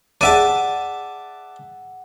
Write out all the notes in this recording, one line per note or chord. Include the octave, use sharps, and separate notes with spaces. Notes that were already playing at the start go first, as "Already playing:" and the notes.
G#4 D5 E5 F#5 A5 D#7